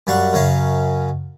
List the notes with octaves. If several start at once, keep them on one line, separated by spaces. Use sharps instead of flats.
F#2 G3 F5 F#5 C#6
F#2 C#3 F#3 C#4 F5